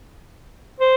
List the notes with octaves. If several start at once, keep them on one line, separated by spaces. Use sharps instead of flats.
C5